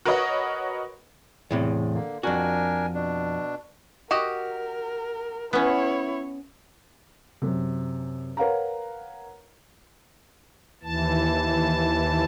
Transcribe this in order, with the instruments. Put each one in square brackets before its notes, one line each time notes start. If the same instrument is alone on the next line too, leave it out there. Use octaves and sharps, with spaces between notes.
[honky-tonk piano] F#4 A#4 B4 C#5 D#5 F#5
[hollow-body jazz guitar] E2 A2 C3
[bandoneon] D3 A#3
[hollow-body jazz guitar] F2 F#4 [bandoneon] D4 A#4 G#5
[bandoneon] B2 D4
[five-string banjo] F#4 G4 D#5 [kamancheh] A#4
[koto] B3 C#4 [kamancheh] E4 C#5
[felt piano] F#2 C3
A#4 B4 C#5 F5 F#5 A#5
[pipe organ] D#2 E3 A5